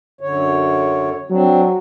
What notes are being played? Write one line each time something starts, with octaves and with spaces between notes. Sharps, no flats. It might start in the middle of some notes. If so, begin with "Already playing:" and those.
F#2 D3 C#5
F#3 C4 D4